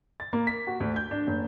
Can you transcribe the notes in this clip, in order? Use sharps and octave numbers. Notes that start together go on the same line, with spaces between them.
A6
A#3
B6
F#4
D2
G6
D4
F#1